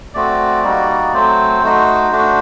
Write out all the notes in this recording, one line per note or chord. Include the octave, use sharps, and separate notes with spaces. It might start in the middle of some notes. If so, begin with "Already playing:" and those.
A3 C4 F#4 D5
G3 A#3 D#4 F#4
F#3 A3 C4 C5
A3 D#4 F#4
A3 D4 F#4